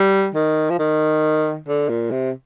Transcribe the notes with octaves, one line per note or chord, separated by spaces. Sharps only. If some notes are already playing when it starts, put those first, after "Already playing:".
Already playing: G3
D#3
F3
D#3
D3
A#2
C3